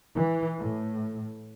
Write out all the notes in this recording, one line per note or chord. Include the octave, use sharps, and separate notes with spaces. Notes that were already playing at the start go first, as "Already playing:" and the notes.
E3
A2